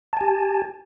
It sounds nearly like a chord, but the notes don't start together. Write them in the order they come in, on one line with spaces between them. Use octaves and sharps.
A5 G#5 G4